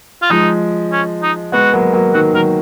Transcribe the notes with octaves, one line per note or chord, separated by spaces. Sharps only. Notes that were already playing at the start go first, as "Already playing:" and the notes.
F4
F3 G#3 D#4
C#4
D#4
G#3 B3 F#4
F#3 A#3
F#3 A#3
D#3 F#3 F#4
D#3 F#3 A#4